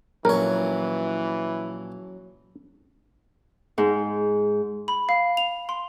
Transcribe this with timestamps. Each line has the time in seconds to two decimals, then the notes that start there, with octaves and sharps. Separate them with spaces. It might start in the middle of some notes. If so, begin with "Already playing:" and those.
0.25 A#1 E3 F#3 C#4 A#4 C#5
3.78 G#2
4.88 B5
5.09 F5
5.37 F7
5.69 C6